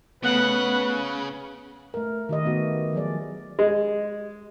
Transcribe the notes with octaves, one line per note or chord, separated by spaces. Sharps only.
C#3 A3 B3 B4 F#5
A3 A#4
D#3 G4 D#5
A3 B3 F#4
F3 F#3 G#4 D5
G#3